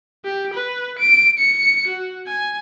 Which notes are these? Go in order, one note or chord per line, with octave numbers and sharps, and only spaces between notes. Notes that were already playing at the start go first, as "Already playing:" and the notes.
G4
B4
D7
C#7
F#4
G#5